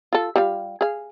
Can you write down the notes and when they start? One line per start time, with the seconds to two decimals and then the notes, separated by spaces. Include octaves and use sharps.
0.13 F4 A4
0.36 G3 F4 F5
0.81 G#4 F5